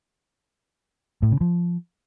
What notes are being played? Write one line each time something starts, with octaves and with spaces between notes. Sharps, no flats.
A2
C#3
F3